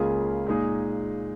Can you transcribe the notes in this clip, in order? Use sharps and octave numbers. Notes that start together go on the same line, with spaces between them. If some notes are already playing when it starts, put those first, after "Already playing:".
Already playing: C#2 C#3 A#3 F4 G#4
A#2 G#3 D#4 G#4